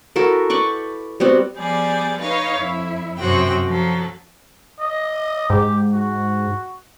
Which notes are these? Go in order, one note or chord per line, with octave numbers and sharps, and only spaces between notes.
E4 F#4 A4 A#4
B4 D5 G5 C#6
G3 B3 C4 F#4
F3 G3 B3 G#4 D5
D#4 B4 C#5 F5
F2 E4
F#2 C3 F#4 C5 G5
F3 F#3 A4
D#5
G#2 G4
F#4